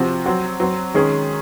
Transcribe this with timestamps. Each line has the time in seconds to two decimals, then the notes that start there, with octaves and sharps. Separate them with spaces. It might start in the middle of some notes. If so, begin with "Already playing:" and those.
Already playing: C3 F3 C4 F#4
0.26 F#3 C4 F#4
0.60 F#3 C4 F#4
0.94 D#3 G#3 C#4 G#4